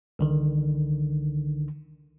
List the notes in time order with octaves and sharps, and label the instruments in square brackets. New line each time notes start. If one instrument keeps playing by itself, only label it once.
[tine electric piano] C2 D3 D#3